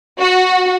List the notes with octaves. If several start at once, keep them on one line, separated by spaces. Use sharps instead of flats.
F#4